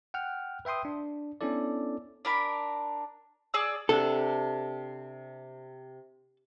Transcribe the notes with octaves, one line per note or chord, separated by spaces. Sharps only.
F#5 G5 F6
B4 E5 G5 C6 D#6
D4
B3 C#4 D4 E4 A4 D5
D4 A#4 B5
G#4 D5 E6
C3 D4 A4 F#5